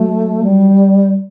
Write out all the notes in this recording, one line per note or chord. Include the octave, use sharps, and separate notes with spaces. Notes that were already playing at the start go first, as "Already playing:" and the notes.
Already playing: F#3 A3
G3